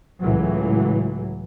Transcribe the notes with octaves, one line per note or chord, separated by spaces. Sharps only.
C#2 A2 E3 F#3